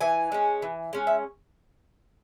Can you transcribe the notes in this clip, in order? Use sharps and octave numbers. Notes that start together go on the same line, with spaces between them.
E3 G#5
G#3 C#4
E3
G#3 C#4
E5